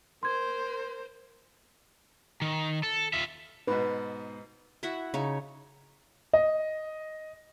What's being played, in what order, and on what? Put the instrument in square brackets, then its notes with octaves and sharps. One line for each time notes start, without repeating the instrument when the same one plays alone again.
[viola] A#4 C5 [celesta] C6 G#6
[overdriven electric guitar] D#3
A4
F4 E5
[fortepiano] G#2 B2 [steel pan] B4
[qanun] E4 F#4 E5 F#5
C#3 D#4 C#5
[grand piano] D#5